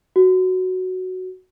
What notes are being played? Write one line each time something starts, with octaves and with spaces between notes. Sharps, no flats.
F#4